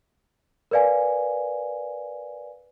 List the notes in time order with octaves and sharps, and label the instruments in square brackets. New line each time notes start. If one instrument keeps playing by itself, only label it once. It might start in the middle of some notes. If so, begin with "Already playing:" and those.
[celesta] A#4 B4 D5 F5 G#5